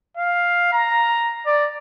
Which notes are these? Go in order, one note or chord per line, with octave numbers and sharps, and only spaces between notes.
F5
A#5
D5